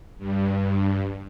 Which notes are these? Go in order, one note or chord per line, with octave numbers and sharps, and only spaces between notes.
G2